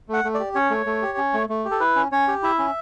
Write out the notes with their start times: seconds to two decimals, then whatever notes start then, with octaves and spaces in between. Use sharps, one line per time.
0.09 A3 F#5
0.24 A3
0.34 D5
0.39 G4
0.55 C#4 C#5
0.70 A3
0.86 A3
1.02 G4
1.18 C#4
1.34 A3
1.49 A3
1.65 G4
1.71 A4
1.80 E4 B4
1.96 C#4
2.12 C#4 C#5
2.28 G4
2.43 E4 E5
2.59 C#4